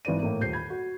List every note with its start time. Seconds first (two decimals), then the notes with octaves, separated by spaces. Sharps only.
0.05 G#1 E3 B4 D5 D#7
0.23 A2 A#3
0.41 D#1 G6 C7
0.53 B5 G#6
0.70 F#4